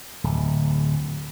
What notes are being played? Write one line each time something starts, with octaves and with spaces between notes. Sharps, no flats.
D1